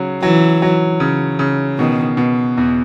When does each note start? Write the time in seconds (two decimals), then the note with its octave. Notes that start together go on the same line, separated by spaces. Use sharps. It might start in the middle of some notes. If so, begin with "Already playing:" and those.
Already playing: C#3 F#3
0.23 E3 F#3
0.62 F#3
1.00 C#3
1.39 C#3
1.78 B2 D#3
2.17 B2
2.57 E2